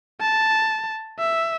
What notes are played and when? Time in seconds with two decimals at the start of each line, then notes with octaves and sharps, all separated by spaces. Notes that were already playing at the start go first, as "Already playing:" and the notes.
0.21 A5
1.19 E5